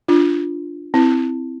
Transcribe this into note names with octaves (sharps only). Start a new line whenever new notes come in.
D4 F4
C4 E4